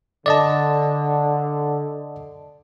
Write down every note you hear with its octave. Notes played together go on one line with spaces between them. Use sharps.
D3 D5 D#5 A5